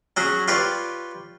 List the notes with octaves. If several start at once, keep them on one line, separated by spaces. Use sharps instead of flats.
F#3 C#4 F#4 G#4
F4 G4 B4 C#5 D5